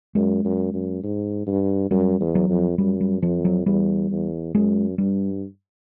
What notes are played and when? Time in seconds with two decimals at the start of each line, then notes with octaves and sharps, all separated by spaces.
0.15 F#2 G#3
0.44 F#2
0.74 F#2
1.04 G#2
1.47 G2
1.91 F#2 G3
2.21 E2
2.35 F#3
2.49 F2
2.78 F#2 G3
3.01 G3
3.22 F2 F3
3.45 F#3
3.66 E2 G3
4.11 E2
4.54 F#2 G#3
4.98 G2 G3